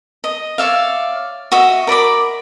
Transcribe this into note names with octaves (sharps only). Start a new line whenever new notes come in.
D#5
C#5 D5 E5 F5
F#4 D#5 E5
A#4 D5 B5 D6